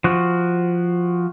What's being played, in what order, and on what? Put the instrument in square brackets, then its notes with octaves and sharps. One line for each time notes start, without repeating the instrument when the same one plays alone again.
[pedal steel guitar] F3 F#4